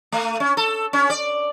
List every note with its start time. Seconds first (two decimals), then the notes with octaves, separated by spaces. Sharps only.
0.12 A3
0.40 C#4
0.57 A4
0.93 C#4
1.10 D5